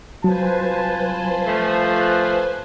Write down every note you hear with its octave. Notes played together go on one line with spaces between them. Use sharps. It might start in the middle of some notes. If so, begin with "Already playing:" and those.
C2 F#3 F4 B4 C5 G#5 A5
F3 A3
F#6